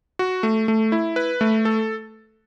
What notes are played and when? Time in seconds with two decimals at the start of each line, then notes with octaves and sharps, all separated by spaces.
0.19 F#4
0.43 A3
0.68 A3
0.92 E4
1.16 B4
1.41 A3
1.65 A4